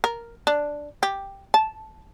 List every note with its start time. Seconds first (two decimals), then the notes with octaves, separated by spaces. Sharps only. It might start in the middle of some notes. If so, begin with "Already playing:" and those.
0.04 A#4
0.47 D4
1.03 G4
1.54 A5